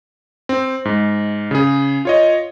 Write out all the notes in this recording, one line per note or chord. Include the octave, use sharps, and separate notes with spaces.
C4
G#2
C#3 G#4
F4 C#5 D#5